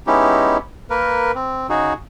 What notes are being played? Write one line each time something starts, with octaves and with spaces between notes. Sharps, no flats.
G#3 B3 C#4 D#4 E4 G4
A#3 A#4 B4
C4
C#3 D#4 F#4 G#4